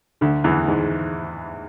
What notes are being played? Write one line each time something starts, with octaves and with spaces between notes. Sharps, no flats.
D2 D3
E2 E3
G#2 G#3